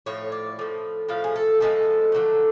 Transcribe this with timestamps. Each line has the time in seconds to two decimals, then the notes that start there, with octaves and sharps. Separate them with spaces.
0.06 A2 F3 C#5
0.32 D5
0.59 A2 F3
1.09 A2 F3 F5
1.24 G#4
1.35 A4
1.60 A2 F3 G#3 A4
2.12 D3 F#3 A3